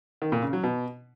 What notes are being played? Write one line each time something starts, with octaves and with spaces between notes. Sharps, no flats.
D#3
A#2
C#3
F#3
B2